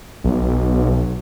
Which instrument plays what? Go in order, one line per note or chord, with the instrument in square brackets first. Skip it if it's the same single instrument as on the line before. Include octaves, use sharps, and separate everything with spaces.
[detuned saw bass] B1